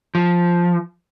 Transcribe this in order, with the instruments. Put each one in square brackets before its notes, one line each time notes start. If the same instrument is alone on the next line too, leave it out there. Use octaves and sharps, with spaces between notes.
[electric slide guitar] F3